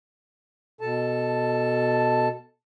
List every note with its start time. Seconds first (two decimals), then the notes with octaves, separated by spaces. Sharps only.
0.81 B2 A4 A5